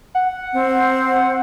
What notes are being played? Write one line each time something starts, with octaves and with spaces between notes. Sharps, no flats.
F#5
C4